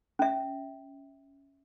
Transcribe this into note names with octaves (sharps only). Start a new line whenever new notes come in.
C#4 E5